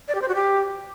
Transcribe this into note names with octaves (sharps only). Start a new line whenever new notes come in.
D5
G4
C5
F#4
G4